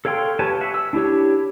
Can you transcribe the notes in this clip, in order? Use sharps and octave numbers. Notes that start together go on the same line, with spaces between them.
A4 C#5 F5 G5 C6
G4 B4 C#5 G#5 A5
F#4 E5
E6
D4 E4 G4 C#5